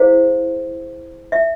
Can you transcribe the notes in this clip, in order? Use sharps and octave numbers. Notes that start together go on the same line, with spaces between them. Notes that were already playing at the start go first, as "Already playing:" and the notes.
Already playing: E4 G#4 C5 F5
E5